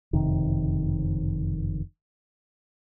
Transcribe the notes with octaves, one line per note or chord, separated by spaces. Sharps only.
F#1 F2 C3 D#3